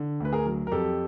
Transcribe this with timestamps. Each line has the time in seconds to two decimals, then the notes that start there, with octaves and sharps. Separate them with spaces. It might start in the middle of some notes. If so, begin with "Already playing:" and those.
Already playing: D3
0.20 D2 B4
0.33 G#4 A#4
0.46 F#3
0.67 A#4
0.72 F2 G4 A4